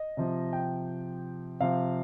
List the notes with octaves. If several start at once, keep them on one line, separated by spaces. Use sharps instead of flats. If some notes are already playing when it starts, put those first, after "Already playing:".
Already playing: D#5
C3 F3
G5
C3 F3 F5